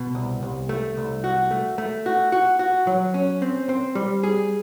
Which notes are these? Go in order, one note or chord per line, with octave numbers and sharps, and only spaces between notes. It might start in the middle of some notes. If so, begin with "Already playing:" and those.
Already playing: B2
C2
C2
A3
C2
F#4
A3
A3
F#4
F#4
F#4
F#3
C#4
C4
C4
G3
G#4